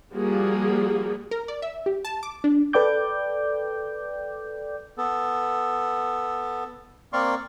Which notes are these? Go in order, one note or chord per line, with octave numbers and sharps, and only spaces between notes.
F3 G3 A#3 F#4 G#4
A#4
D5
E5
G4
A5
D6
D4
A4 B4 D5 G5 D6 G6
B3 A4
A#3 C4 A#4 D5 C6 C#6